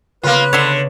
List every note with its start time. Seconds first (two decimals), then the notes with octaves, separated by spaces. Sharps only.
0.23 C#3 A#3 B3 F4 B4
0.53 D3 C#5 E5 C6